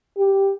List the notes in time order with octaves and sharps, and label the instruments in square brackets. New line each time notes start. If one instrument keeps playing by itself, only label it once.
[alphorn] G4